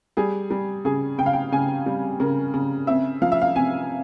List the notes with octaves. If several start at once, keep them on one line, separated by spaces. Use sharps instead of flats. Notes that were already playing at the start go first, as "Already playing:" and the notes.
G3 G#4
G3
C#3 G#4
C#3 G5
F5
G5
C#3 G#5
G3
C#3 A#4
C#3
C4 E5
F3 F5
E5
F5
C3 G#5